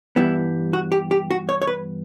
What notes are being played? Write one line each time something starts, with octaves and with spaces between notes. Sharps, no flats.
G2 E3 G3 B3 E4
F#4
G4
G4
F#4
C#5
C#5
B4